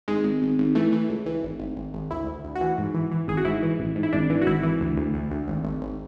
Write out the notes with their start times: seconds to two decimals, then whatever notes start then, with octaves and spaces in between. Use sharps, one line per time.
0.08 G#1 G#3
0.24 G#1
0.42 G#1
0.58 G#1
0.75 E3 A3
0.92 E3
1.09 C#2
1.26 E3
1.42 G#1
1.59 G#1
1.76 G#1
1.93 G#1
2.11 D2 E4
2.27 D2
2.44 D2
2.55 F#4
2.61 E3
2.78 G#2
2.94 E3
3.12 E3
3.28 G#1 G#4
3.37 F#4
3.45 G#2 E4
3.63 E3
3.79 A1
3.96 G#2
4.03 E4
4.13 G#1 D4
4.30 E3
4.42 F#4
4.46 G#1 E4
4.63 E3
4.80 D2
4.96 D2
5.14 D2
5.31 D2
5.48 G#1
5.64 G#1
5.82 G#1